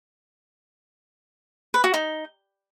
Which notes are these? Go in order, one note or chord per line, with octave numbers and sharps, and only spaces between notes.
B4
F#4
D#4